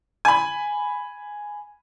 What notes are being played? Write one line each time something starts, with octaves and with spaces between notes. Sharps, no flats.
G#5 B5